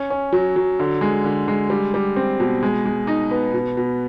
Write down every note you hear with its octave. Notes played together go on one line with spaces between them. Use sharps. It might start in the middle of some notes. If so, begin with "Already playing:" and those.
Already playing: C#4
C#4
F#3
F#3
D3
G#3
D3
G#3
G3
G3
C4
B2
G#3
G#3
D#4
B3
B2
B2